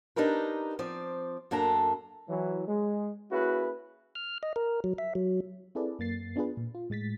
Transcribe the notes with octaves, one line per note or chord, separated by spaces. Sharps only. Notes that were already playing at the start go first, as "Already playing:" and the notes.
D4 D#4 G4 A#4 B4
F3 C4 D5
F#2 A#3 D4 A4 A#5
E3 F#3
G#3
A#3 C#4 E4 F#4 G#4 B4
F6
D#5
A#4
F#3
E5
F#3
C4 E4 G#4 A4 B4 D5
F#2 A#3 A6 C7
B3 D4 F4 G#4 B4
A#2
F4
A2 G#3 A6 B6